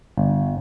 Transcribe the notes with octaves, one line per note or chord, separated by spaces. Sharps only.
G1